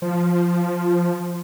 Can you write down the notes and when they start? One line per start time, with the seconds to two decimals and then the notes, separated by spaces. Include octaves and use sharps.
0.02 F3